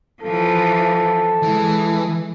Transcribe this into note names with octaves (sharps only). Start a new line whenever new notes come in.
E3 F3 A4
E3 G#3